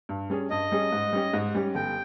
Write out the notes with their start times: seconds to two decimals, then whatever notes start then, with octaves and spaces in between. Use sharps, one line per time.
0.09 G2
0.30 G3 C#4 G#4
0.50 G2 D#5
0.72 G3 C#4 G#4
0.92 G#2
1.13 G3 C#4 G4
1.33 G#2
1.55 G3 C#4 G4
1.75 G1 G5